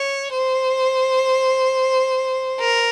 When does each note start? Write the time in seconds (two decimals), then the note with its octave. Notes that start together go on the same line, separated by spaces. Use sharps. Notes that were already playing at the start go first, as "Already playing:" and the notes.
Already playing: C#5
0.33 C5
2.60 A#4